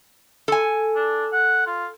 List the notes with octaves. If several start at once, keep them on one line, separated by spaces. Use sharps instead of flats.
A4 G#5
D4
F#5
F4